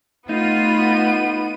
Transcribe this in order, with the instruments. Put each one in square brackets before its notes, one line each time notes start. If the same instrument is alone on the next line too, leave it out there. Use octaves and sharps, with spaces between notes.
[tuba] A3 [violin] B3 D#7 [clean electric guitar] D#4 [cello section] F4